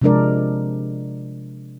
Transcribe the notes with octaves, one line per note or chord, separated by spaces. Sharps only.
C3 F3 G#3 D4 A#4 D5